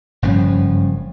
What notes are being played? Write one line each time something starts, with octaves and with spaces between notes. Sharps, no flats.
F#1 G2 F3 C#4